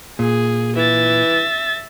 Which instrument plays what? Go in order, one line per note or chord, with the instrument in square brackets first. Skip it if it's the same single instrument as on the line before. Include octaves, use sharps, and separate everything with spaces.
[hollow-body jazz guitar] A#2 [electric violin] G#4
[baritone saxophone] E3 [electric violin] E5 A6